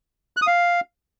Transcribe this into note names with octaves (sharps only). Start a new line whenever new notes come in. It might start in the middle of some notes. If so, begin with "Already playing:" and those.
F#6
D#6
F5